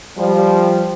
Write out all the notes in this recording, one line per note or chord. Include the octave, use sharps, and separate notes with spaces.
F3 G3